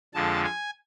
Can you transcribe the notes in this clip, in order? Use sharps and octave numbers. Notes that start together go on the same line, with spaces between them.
F2 D3 F3 G#3 A5
G#5